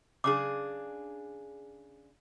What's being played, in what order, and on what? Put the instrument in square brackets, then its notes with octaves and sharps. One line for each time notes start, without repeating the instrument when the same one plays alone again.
[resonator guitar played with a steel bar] C#3 D4 G#4 [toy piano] D6